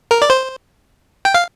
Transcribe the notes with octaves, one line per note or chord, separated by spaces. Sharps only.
A#4
D5
C5
G5
F5